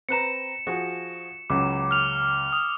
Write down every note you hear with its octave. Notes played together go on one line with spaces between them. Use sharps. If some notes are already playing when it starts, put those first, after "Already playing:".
C4 B4 A#5 C#7 E7
F3 F#4 G#4
C#2 C#3 F#3 D6
F6 F7
D#6